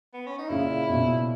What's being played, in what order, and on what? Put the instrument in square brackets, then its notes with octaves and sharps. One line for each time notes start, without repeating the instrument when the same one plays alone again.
[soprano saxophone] B3
C#4
D#4
[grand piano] A#2 C#3 [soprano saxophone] E4
[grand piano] B2